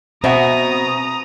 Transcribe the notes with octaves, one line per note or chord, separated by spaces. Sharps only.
B2 C4 E5 F#5 A#5 D#6